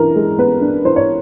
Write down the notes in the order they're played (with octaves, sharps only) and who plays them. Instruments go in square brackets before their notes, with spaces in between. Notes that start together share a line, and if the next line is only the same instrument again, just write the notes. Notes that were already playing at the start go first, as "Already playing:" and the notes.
Already playing: [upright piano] E3 D4 A#4
G#3
B3 B4
D4
E3 C5
C#5